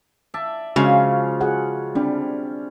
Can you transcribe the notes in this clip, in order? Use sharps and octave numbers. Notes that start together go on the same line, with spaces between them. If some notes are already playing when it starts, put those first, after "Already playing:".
D5 E5 A5
C#3 F3 G#3 C#4 F4 F#4
F#4 G#4 F#5
G3 C4 D4